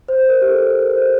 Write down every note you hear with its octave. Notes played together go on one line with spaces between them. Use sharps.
C5
A#4
G4
A4
A#4
A#4
C5